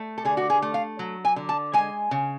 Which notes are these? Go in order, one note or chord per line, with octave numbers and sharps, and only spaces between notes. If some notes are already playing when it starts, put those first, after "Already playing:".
Already playing: A3
A4
D3 G#4
F#4
G#4
A3
F5
F#3
G#5
D3
A5
G#3 G#5
C#3